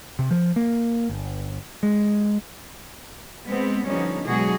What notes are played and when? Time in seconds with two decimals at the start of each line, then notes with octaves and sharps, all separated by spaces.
0.19 C3
0.31 F3
0.56 A#3
1.10 G1
1.83 G#3
3.45 G#3 B3 C4
3.82 D3 F3 G3 B3 C#4 D#4
4.23 B2 D3 F#3 G#3 F#4 G#4